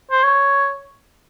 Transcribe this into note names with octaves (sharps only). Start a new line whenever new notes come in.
C5
C#5